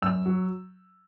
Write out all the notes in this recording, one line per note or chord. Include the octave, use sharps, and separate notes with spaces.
F#2 E6
F#3